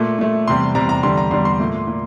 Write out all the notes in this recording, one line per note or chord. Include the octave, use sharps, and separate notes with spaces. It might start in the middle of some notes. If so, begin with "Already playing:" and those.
Already playing: A#2 A3
A#2 A3
E2 C3 G3 C6
E2 C3 G3 A#5
A#5
E2 D3 G3 C6
A#5
E2 D3 G3 C6
C6
A#2 A3
A#2